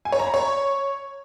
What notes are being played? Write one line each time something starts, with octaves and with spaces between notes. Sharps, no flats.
G#5
C#5
A#5
B5
C#5